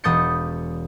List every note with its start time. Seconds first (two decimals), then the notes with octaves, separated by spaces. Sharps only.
0.04 E1 B5 D#6 G6 A6 C#7